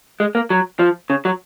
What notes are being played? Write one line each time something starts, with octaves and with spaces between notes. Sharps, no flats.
G#3
A#3
F#3
F3
C#3
F#3